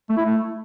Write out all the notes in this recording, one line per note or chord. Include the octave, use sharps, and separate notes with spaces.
A3
E4
A3